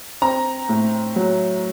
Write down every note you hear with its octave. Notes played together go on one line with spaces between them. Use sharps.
C4 A#5
A2
F#3